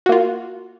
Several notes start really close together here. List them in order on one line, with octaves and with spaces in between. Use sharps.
F#4 A#3 F4